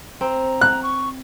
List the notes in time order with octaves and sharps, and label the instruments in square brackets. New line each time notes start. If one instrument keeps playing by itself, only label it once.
[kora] C4 [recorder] A#5
[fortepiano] F#6
[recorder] C#6